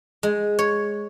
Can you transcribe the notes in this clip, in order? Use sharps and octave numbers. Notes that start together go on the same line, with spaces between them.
G#3
C#5